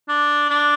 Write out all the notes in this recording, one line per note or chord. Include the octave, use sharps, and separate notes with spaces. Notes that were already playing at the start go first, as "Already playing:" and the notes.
D4
D4